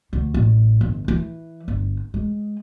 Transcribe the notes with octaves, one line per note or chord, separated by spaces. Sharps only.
D2
A1
G1
E3
G1
G#3